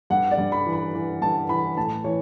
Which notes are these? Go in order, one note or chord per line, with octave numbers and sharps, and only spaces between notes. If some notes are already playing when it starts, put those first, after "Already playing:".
G2 F#5
D5
G2
B5
E3
B5
E3
G2 A5
E3 B5
A2 A5
E3 C#5